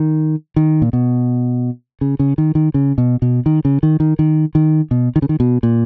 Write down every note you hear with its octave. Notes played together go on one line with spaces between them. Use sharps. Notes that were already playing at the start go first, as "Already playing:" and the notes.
Already playing: D#3
D#3
A#2
B2
C#3
C#3
D#3
D#3
C#3
B2
B2
D#3
C#3
D#3
D#3
D#3
D#3
B2
D#3
C#3
D#3
B2
A#2